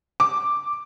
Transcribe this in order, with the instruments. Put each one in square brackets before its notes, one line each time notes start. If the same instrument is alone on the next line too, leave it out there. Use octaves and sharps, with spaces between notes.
[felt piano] D6